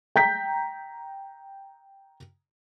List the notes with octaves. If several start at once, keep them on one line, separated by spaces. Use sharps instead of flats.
G5 A#5 G6 B6